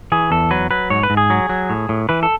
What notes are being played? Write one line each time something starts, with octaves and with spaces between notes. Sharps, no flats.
E3 G#4
E2 A4
F#3 B4
F#3 B4
G#2 C#5
B4
G#2
G#4
F#3
F#3
A2
A2
E3 B4
A4